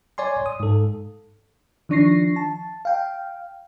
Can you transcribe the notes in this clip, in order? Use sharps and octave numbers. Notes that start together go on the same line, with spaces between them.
C#5 D5 G#5 C6
D#6
G#2 A4
D#3 F3 D4 C#6 A#6 C7
A5
F5 G5